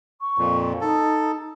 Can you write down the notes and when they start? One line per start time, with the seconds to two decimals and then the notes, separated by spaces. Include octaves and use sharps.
0.20 C#6
0.38 F2 A#2
0.81 D#4 A4